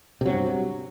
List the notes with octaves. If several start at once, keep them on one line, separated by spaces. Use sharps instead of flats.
G2 C3 F#3